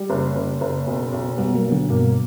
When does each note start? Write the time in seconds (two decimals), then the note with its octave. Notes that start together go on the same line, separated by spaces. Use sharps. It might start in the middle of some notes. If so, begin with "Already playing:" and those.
Already playing: G3
0.10 F#1
0.36 F#1
0.61 F#1
0.87 B1
1.12 B1
1.38 B1 G3 B3
1.55 F#3 A#3
1.64 B1
1.72 D3 F#3
1.89 G2 B2 A#3